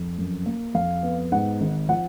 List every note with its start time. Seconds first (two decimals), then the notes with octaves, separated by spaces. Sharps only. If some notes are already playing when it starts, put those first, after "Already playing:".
Already playing: F2
0.18 F#2
0.46 A#3
0.74 F2 F5
1.03 B3
1.32 G#2 F#5
1.61 G#1
1.89 F3 F#5